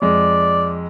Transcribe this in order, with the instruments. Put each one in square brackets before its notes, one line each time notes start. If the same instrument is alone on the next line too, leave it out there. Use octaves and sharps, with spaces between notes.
[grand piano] F2 G#3 [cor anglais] D5